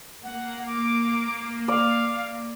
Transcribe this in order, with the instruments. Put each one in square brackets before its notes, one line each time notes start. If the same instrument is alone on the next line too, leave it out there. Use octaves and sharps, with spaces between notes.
[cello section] A#3 [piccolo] F#5
[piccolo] D6
[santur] D5 [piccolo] F5